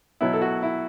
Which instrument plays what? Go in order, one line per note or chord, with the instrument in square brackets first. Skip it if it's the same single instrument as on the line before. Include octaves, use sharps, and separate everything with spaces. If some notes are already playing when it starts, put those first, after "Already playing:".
[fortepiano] B2 F#3 B3 E4
A4
F#4
E4